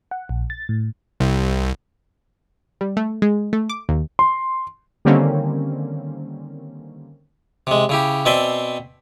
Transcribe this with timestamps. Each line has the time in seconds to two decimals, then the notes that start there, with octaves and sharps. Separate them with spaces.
0.11 F#5
0.29 A#1
0.50 A6
0.69 A2
1.20 C2
2.81 G3
2.97 A3
3.22 G#3
3.53 A3
3.70 D6
3.89 D#2
4.19 C6
5.05 D3 D#3 G3 A#3 C4 C#4
7.67 C3 G#3
7.89 C#3 E4 G4
8.25 B2 C4 D5 E5 G#5 C6